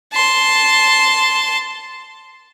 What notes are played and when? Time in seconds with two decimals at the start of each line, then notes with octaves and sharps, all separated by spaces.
0.13 A5 C6